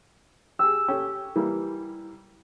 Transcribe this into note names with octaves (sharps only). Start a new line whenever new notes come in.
G4 G#4 E6
C#4 G4 A4
E3 G3 A#3